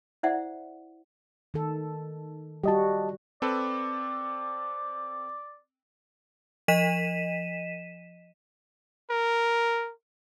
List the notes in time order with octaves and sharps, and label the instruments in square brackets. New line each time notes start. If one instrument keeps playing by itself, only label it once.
[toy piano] E4 C5 D5 E5 F#5
[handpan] D#3 A4
[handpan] G3 F#4 [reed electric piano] G4 D#5 A5
[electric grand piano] C4 A4 B4 [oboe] D5
[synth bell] F3 D#5 B6 D#7 E7
[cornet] A#4